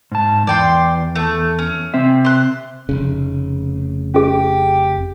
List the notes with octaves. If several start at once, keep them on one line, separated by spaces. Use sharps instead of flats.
G#2 A5
E2 D5 G5 C6
A3
C#4
C3 C4 E5
C6 F#6
F1 C#3
C#4 G4 G#4